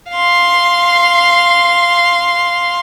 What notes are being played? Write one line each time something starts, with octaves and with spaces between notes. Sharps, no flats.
F5 C6